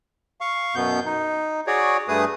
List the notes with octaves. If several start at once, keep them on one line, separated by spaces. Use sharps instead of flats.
F5 C#6
F#2 B2 B3 G6
D#4
F#4 G#4 C#5 D5
G2 A3 G#4 B4 D#6